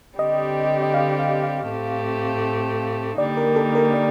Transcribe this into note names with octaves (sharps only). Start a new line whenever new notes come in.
D3 G3 C4 G4 D#5
D#5
F5
F5
F5
A2 A3 C4 G4
D3 G3 A#3 D#4 D5
A#4
A4
A#4
D5